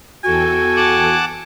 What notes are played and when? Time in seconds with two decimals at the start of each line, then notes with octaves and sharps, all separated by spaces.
0.24 E2 F#4 A4 G5 G#5
0.76 F#5 A5 D6